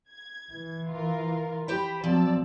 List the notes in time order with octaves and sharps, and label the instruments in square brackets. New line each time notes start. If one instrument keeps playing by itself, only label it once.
[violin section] G#6
[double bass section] E3
[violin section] F4 A#4
[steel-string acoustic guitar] G4 C5 G5 [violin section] B5
[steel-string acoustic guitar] F3 [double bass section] F#3 C4 [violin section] D5 A5 E6